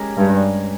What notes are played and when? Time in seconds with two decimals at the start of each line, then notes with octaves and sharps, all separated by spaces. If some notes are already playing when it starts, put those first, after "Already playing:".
Already playing: G#3 C#4 G4 A#4
0.17 G2